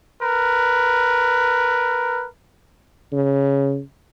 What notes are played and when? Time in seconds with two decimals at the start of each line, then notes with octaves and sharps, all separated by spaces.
0.22 A#4 B4
3.13 C#3